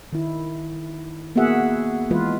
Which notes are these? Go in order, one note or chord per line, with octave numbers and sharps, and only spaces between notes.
D#3 E4
A#3 B3 F#4 G#4 E5 F#5
E3 G#3 F4 B4